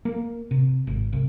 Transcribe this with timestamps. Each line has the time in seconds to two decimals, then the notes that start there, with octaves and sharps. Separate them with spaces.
0.05 A#3
0.51 C3
0.87 G#1
1.13 C2